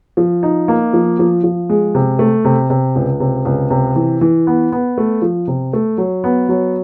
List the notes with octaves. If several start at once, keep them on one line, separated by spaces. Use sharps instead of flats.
F3
D#4
A#3
F3
F3
F3
G#3
C3
A3
C3
C3
C#2
C3
C#2
C3
E3
E3
B3
B3
A3
F3
C3
A3
F#3
B3
F#3